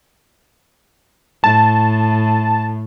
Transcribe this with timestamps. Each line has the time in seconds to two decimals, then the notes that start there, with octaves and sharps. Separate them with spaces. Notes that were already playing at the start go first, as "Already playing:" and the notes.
1.44 A2 A5